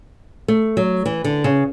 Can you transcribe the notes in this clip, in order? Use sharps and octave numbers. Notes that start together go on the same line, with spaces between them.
A3
F#3
E3
D3
C#3